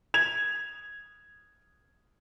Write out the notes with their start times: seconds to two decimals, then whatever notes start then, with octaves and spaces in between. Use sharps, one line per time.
0.14 G#6 F7